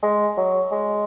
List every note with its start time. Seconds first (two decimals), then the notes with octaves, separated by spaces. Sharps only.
0.03 G#3
0.37 F#3
0.72 G#3